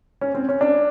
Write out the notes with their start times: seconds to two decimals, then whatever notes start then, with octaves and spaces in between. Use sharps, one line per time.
0.21 C#4
0.34 C4
0.49 C#4
0.61 D4